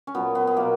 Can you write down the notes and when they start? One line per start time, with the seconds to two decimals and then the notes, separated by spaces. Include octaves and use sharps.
0.07 C#4
0.15 A#2 F#3 B3
0.35 B3
0.47 B3
0.57 B2 F#3 A#3